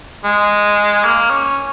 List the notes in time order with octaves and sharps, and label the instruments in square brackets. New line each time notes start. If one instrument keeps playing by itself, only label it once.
[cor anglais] G#3
A#3
C#4